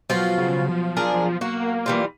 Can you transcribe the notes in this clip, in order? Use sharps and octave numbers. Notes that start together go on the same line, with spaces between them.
B2 F3 F#3 F4 F#4
C#3
F3
D4 G#4 A#4
A#3 F#4
E3 G3 F4